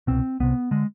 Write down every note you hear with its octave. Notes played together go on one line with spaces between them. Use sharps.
C2 B2 C4
C2 C3 B3
D3 G#3